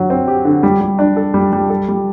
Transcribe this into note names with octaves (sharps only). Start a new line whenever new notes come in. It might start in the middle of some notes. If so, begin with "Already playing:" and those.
Already playing: D3 F#3
C4
G4
D3
G3
G3
D4
A4
G3
G3
A4
G3